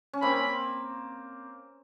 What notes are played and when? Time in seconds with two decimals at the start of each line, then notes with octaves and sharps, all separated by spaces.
0.13 C#4
0.22 A#3 C4 B5